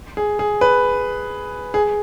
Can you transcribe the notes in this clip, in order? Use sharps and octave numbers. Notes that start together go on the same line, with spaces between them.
G#4
G#4
B4
G#4